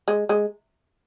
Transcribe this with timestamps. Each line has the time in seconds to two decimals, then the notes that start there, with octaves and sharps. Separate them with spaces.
0.08 G#3
0.29 G#3